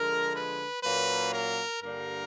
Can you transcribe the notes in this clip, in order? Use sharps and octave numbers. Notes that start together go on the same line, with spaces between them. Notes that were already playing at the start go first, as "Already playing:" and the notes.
Already playing: D3 F3 G#3 A#4
B4
A#2 F#3 A#3 C#4 B4
A#4
G2 D3 G3 A#3 A#4